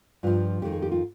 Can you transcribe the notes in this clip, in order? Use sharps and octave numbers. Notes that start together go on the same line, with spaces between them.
G2 F3 F4
F2 D#3 G4
G#4
G4
F4